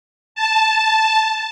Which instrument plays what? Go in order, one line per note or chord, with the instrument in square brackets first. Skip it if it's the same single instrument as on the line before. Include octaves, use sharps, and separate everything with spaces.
[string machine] A5